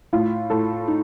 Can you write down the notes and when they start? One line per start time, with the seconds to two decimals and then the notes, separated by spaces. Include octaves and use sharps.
0.13 A2 F4
0.50 A2 A4
0.88 D#4